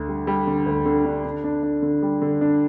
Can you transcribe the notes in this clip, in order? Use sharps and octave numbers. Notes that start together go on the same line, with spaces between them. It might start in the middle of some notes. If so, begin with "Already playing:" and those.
Already playing: D2 D3
G3
G3
D3
D2
D3
D4
D3
D4
D4
D3
G3
D3
D4